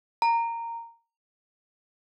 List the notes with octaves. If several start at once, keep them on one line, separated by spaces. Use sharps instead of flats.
A#5